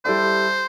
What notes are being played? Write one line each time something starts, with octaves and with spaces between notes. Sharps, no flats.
G3 E4 A4 C5 D5